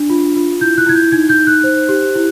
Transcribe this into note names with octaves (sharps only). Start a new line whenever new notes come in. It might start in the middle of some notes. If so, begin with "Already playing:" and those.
Already playing: D4
F4
F4
E4 G6
F#6
E4 G#6
G6
D#4 G#6
G6
D#4
F#6
C5
G4
E4